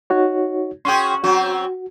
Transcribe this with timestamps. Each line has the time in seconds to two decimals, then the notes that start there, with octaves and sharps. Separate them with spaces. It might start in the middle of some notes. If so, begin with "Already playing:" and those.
0.10 D#4 F#4 C#5
0.85 C#4 F#4 G#4 G5 C6
1.24 F#3 C4 C#4 F#4